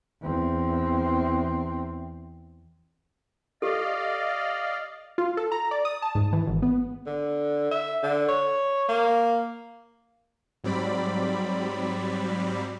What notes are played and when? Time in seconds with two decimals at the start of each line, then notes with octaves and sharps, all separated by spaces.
0.22 E2 C4
3.62 G4 A4 D5 D#5 F5
5.18 F4
5.37 A4
5.52 A#5
5.71 D5
5.85 D#6
6.02 A5
6.15 G#2
6.33 E3
6.47 G#1
6.62 B3
7.07 D3
7.72 E5
8.03 D3
8.29 C#5
8.89 A#3
10.64 G#2 F#3 G3 C4 D5 B5